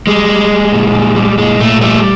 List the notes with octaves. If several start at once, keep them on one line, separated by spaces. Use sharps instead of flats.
G3 G#3
G3
G3
A#2
G3
G3
A#2 G#3
A#2 A3
G3 A3